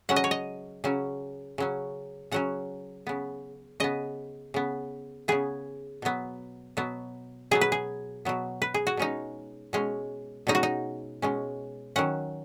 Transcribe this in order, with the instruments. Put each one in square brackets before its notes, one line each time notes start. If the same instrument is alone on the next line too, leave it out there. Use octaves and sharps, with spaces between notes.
[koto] C#3 F#3 C#4 F#5
D#5
C#5
D#5
C#3 F#3 C#4
C#3 F#3 C#4
C#3 F#3 C#4 F#5
C#3 B3
C#3 B3 D#5
C#3 B3
C#3 B3 G#4
B2 F#3 B3
B2 F#3 B3
B2 F#3 B3 G#4
B4
G#4
B2 F#3 B3
B4
G#4
F#4
B2 G#3 C#4 D#4
B2 G#3 C#4
B2 G#3 C#4 D#4
F#4
D#4
B2 G#3 C#4
D#3 F#3 C#4 F#5